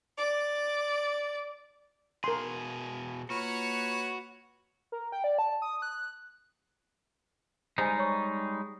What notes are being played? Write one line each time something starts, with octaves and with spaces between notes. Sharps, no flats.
D5
B2 G#4 A#4 C6
A#3 F4 F#4 B4 C#5
A#4
G5
D5
A5
D#6
F#6
G3 G#3 D#4 C5 G#5
C#5 C#6